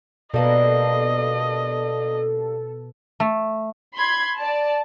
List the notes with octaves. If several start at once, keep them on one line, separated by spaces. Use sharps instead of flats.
B2 G3 A#3 D4 A4 B4 D#5
A3
B5 C6 G#6
D5 A5